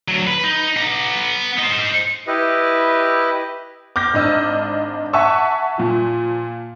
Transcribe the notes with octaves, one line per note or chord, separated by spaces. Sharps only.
D2 F#3
B4
D#4
B3 A#5
D#4 C5
E4 G4 B4 D#5
D6 F6 G6 A#6
G#1 D4 D#5 E6
E5 F#5 G#5 A5 C#6 E6
A#2 F3